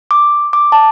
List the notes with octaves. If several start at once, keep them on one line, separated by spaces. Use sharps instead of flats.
D6
D6
A5